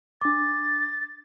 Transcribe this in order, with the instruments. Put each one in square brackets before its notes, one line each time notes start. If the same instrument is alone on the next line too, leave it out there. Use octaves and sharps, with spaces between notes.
[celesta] D4 D6 [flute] A6